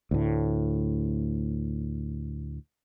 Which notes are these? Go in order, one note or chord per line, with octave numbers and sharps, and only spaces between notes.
D2 A2